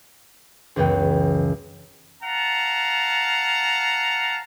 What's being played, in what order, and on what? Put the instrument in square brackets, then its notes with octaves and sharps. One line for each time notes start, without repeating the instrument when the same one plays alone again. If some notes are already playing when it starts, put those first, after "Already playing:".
[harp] C#2 F#2 E3 B3 G5
[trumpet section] F5 F#5 A5 A#5